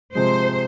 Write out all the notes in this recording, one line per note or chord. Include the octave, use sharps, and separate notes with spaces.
C3 F3 G#3 C5